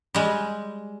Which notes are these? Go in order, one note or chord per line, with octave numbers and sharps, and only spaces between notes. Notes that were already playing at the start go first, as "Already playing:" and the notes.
G3 G#3